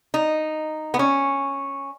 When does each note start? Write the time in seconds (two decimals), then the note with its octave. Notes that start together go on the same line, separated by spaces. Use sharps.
0.14 D#4
0.94 B3
0.99 C#4